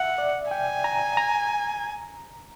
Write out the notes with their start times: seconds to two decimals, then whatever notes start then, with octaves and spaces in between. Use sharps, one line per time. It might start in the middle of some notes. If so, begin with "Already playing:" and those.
Already playing: E5 F#5
0.18 D5
0.51 G5 G#5
0.84 A#5
1.17 A#5